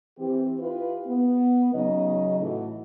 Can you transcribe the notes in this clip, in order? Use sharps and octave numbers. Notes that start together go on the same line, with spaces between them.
E3 C4 G4
E4 F4 G4 B4
B3
C#3 F#3 D#4 D#5
A2 E3 A3 F#4